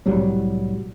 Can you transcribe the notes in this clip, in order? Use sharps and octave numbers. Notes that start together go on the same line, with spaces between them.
C2 A2 F#3 G3